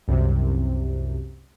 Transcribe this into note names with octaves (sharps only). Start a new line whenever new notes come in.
C2 F#2 C3